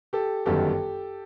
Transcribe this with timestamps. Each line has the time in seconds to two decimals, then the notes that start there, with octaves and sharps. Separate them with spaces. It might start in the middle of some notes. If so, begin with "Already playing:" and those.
0.13 G4 A4
0.46 G1 F#2 D#3 G3 G4 A4